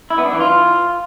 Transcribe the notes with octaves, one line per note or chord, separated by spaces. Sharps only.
E4
B3
D4
E3
F4